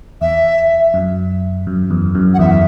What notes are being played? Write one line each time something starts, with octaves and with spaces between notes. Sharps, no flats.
E2 E5
F#2
F#2
E2
F#2
F#5
E2 E5